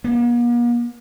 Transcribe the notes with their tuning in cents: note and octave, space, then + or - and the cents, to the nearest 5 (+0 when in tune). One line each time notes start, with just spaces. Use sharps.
A#3 +45